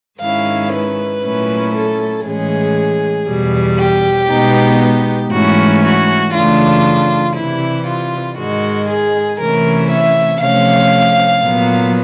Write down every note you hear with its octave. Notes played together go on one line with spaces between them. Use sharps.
G#2 D#3 G#3 C#4 E4 F5
B4
A#2 F#3 A3 C#4 E4
A4
A2 E3 G#3 C#4 G#4
E2 B2 G3
G4
B2 G#3 B3 D#4
G#2 E3 A3 C#4 E4 F#4
F#4
F#2 C#3 E3 A3 D4 F4
C3 E3 G3 E4
F4
G#2 D#3 G#3 F#4
G#4
C3 E3 A3 C#4 E4 A#4
E5
C3 F3 A3 C#4 F5
A#2 F#3 B3